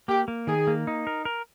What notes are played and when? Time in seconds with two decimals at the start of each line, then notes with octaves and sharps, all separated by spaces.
0.08 A#3 G4
0.28 A#3
0.47 D#3 G#4
0.67 A#3
0.87 D#4
1.07 A#4
1.25 A#4